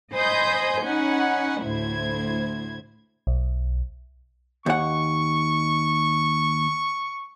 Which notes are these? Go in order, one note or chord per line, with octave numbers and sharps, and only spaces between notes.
C5 D#5 G#5 B5 D#6 G6
C#4 D#4 F#5 G#5 B5
D2 A2 E4 C5 G#6
B1
D#2 F#5 C#6